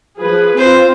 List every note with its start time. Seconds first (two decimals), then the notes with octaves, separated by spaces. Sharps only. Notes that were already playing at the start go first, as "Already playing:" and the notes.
0.19 F3 G#4 B4
0.58 C4 F4 C5